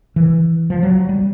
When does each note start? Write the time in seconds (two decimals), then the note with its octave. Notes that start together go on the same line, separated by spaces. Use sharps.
0.16 E3
0.70 F3
0.83 F#3
1.09 G3